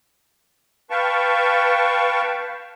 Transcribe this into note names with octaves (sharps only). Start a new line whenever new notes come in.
B4 F5 G5 A5 C#6